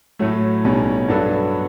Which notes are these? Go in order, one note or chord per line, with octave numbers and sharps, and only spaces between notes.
A2 F#3 A3
B1 B2 G3 C#4
G2 F#3 B3 D4 A4